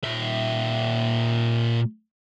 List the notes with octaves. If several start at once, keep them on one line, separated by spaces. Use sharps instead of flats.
A#2 E5